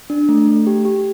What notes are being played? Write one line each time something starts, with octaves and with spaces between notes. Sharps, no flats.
D4
A3
A3
G4
G4